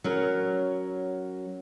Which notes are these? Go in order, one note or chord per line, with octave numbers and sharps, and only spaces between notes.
F#3 C#4 A#4